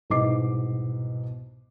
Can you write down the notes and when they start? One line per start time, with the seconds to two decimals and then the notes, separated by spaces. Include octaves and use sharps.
0.10 C2 G#2 B2 D#5 D6 C7